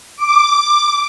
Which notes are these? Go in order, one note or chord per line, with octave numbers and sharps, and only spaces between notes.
D6